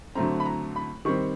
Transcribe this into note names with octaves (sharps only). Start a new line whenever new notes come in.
D3 F#3 A3 C4 A#5
B5
A#5
B5
D#3 G3 C4 C#6